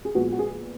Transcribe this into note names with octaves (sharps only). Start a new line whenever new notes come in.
G#4
A#2 F3 G#3 B3 F#4
F#4
G#4